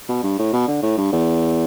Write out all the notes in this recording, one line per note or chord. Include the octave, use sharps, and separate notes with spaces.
B2
G2
A2
B2
D3
A2
G2
E2